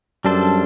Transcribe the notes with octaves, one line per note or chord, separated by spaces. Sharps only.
F#2 G3 D4 A4 C5